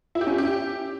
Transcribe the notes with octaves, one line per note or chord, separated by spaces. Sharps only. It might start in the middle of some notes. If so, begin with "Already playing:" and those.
E4
G4
C#4
E4
G4